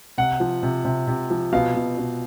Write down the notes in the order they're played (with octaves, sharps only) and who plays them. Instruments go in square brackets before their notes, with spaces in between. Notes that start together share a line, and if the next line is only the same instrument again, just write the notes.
[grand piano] C3 F#5
F3
C3
C3
C3
F3
B2 F5
B2
B2